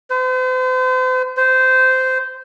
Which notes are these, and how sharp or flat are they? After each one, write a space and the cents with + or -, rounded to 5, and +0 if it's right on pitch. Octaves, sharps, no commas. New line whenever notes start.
C5 -40
C5 -15